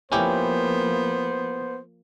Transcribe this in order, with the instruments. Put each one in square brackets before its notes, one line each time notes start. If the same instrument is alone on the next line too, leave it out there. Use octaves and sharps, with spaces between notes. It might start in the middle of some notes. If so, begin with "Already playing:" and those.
[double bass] F3 A#3 [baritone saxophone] B3 [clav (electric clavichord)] C#4 E4 G4 [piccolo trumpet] C5